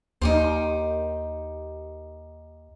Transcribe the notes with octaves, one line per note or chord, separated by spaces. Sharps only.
D#2 D#4 G4 C5